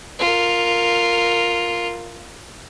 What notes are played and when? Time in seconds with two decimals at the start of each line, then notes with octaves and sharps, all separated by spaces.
0.19 F4 A#4